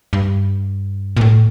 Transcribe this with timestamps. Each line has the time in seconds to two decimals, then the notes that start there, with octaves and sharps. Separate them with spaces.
0.13 G2
1.17 A#2
1.21 A2